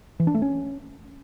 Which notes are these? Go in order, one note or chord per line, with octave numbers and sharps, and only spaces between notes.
E3
D4
A3
C#4